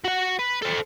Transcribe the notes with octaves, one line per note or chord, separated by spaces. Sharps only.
F#4 F#5
B4
A4 C5